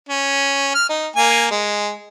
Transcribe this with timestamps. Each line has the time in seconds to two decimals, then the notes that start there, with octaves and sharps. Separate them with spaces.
0.09 C#4
0.75 F6
0.89 D#4
1.16 A#3 G#5
1.51 G#3